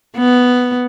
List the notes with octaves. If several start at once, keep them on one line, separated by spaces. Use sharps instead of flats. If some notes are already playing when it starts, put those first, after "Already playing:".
B3